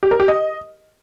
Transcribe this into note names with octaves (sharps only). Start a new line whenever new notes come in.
G4
A#4
G4
D#5